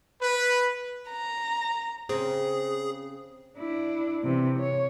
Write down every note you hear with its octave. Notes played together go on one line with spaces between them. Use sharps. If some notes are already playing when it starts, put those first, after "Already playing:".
B4
A#5
C#3 C4 G#4
D4 E4
C3 E3
C#5